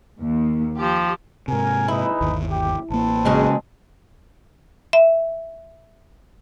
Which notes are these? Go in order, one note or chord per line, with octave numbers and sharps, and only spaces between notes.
D#2
F3 G4
G#2 C3 A#4 G#5
D#4 E4 G#4 B4
G1 D#2
G4
A1 A#3 C4 B4 A5
C#3 F#3 G#3
E5